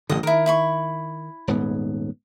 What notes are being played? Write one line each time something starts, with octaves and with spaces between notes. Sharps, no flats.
A1 G2 D3 D#5
D#3 E4 A#4
E4 B5 C#6
D#1 G#2 B3